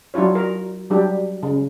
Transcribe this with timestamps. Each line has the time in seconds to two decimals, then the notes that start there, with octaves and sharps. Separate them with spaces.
0.14 F#3 D4 E4 F4 C#5
0.35 A#4
0.91 F#3 G3 D4 G4
1.43 C#3